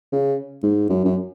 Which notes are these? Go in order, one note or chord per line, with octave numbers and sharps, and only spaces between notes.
C#3
G#2
F#2
F#2